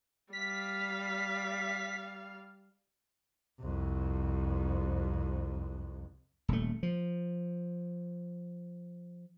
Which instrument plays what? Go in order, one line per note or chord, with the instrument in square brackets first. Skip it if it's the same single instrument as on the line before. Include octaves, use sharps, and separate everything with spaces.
[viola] G3 F5 [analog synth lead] B6
[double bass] C2 F2
[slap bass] D#1 A3
F3